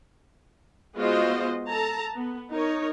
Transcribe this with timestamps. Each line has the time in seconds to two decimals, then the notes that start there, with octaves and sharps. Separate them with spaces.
0.96 G#3 B3 F4 F#4 C5 D#5
1.69 A4 A5 A#5
2.15 B3
2.50 D#4 A#4 C#5